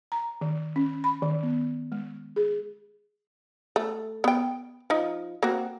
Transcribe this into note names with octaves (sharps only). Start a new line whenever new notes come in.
A#5
D#3
C#4
B5
D#3
B3
G#3
G#4
A3
B3 G5
F3 D#4
A#3 C4 F#4